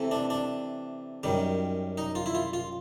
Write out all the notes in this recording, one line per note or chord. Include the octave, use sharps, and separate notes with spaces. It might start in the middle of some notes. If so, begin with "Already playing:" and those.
Already playing: C3 E3 A3
D4
D4
F#2 D#3 G3
D#4
F4
E4
F4
F4